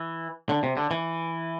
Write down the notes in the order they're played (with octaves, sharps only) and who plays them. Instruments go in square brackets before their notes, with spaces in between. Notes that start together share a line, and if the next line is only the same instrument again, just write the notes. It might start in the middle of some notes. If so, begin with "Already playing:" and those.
Already playing: [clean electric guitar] E3
D3
C3
D3
E3